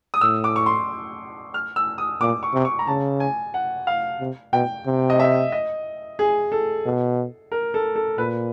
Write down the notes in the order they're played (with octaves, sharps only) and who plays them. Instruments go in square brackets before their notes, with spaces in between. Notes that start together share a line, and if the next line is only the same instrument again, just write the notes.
[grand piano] D#6
[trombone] A2 [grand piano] E6
[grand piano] D6
C#6
C6
F6
E6
D#6
[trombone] A#2 [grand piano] D6
[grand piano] C#6
[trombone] C3
[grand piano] C#6
A#5
[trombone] C#3 [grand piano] A5
[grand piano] G#5
F#5
F5
[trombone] C3
[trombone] B2 [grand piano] G5
[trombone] C3
[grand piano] D#5
E5
D#5
G#4
A4
[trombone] B2
[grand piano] A#4
A4
A4
[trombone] A#2 [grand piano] B4